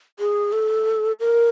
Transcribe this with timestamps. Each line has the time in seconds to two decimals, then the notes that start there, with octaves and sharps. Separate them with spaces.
0.19 G#4
0.52 A4
1.20 A#4